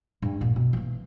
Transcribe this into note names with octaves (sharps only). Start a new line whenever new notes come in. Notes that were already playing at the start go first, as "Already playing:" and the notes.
G2
A#2 A#3
B2
E3 A#3